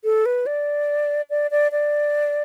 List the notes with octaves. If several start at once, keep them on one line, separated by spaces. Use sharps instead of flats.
A4
B4
D5
D5
D5
D5